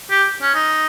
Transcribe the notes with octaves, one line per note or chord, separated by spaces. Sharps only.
G4
C#4
D#4